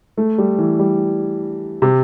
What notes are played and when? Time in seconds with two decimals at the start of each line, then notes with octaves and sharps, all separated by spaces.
0.17 A3
0.38 G3
0.59 E3
0.79 G3
1.82 C3